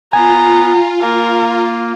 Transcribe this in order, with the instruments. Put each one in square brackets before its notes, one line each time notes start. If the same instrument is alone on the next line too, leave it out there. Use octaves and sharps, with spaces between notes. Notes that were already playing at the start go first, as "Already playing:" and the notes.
[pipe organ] B3 [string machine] F4 [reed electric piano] G#5 [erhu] A#5
[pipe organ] A#3 [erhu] A#4